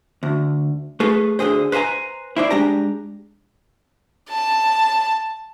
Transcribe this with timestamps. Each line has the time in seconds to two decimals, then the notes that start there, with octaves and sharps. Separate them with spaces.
0.23 D2
1.00 A3 G#4 A4 B4
1.39 D2 D3 G#4 C5
1.72 B4 C5 E5 G#5 A#5
2.37 E4 C5 D5
2.51 G#3 D4 G4 A#5
4.29 A5